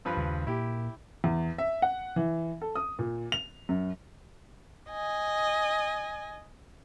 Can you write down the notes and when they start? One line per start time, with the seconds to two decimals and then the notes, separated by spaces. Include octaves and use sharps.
0.05 G2 F3 B4
0.17 D#2 C#3
0.47 A#2 A#3 E4 G4
1.24 E2
1.58 E5
1.82 F#5
2.16 E3
2.61 A4
2.75 D#6
2.99 A#2
3.32 F7
3.69 F#2
4.90 D#5 G#5